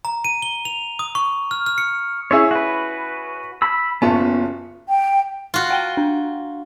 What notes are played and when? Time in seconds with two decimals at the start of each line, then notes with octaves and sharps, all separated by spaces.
0.05 A#5
0.24 D#7
0.42 G7
0.65 F7
0.99 D#6
1.15 C#6
1.51 F6
1.66 F6
1.78 C#7
2.31 C#4 E4 G#4 C#5 E5
2.51 F#4 B4
3.62 B5 E6
4.02 F#1 B3 C#4 F4 F#4 A5
4.89 G5
5.54 F4 F#4
5.70 F#5 G5 G7
5.97 D4